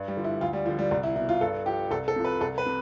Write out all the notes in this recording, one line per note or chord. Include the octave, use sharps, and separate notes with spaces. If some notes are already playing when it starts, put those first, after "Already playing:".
Already playing: G2
G3
D3 F3
E4
D2 F4
G3
F3
D3
G3
C2 G3
E4
B2 E4
F4
G2 A4
F3 G4
C2 A4
A4
C3 F3
B4
C2 A4
B4
C3